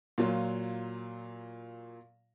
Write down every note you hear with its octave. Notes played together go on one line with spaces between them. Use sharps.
A#2 F#3 F4